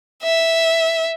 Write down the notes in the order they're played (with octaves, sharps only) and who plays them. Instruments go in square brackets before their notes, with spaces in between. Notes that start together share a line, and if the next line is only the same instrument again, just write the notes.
[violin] E5